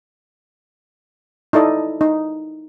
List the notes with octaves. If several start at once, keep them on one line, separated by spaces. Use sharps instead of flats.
D#4 E4 A4 D5 D#5
D#4